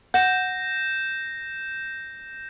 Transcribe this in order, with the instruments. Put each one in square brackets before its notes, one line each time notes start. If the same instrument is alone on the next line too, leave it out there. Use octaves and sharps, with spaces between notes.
[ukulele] F#5 [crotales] G6 A#6 E7